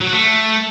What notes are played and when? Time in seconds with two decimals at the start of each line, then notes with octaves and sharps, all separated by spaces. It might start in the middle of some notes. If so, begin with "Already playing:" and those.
0.01 F#3
0.07 F#4
0.13 A3